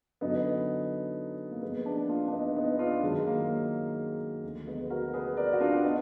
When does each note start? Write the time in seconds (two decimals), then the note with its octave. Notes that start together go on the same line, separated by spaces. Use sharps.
0.21 F#2 D3 F#3 B3 D#4
1.51 A#3
1.62 F2 F3 G#3 B3
1.85 A#3 D4
2.09 D4 F4
2.28 D4
2.32 B3 D#4
2.56 B3 D#4
2.79 D4 F4
3.03 F#2 D#3 F#3 G#3
3.27 A#3
3.50 G#3
4.43 D2 D3 F3
4.67 G#3 B3
4.90 F#4 A#4
5.14 G#4 B4
5.37 A#4 D5
5.53 F#4
5.60 D4 F4
5.74 F4
5.84 B3 D#4